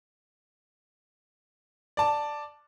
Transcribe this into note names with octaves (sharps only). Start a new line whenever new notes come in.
D5 A5